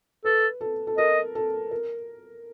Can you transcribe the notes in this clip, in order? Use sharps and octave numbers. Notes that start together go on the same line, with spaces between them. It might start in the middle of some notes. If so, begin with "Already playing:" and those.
A4 B4
A4
A4
A#4 D#5
A4
A#4